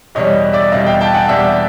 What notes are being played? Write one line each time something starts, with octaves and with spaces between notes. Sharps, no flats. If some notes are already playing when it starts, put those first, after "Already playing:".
E2 B2 G3 C#5 D#5
D5 E5
E2 B2 G3 D#5 F5
F5 G5
G5 A5
F#5 G#5
E2 B2 G3 E5 F#5